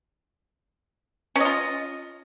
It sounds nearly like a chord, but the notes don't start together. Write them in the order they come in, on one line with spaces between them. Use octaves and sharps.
C#4 D#5 F4